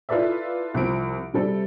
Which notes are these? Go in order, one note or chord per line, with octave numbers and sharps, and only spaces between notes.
E4 F4 A4 B4 D5 E5
C2 F3 D7
C3 G3 A4